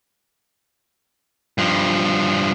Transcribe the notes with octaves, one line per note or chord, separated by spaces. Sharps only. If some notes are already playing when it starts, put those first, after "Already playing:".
G2 F3